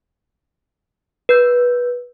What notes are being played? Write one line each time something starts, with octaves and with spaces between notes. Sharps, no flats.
B4 G6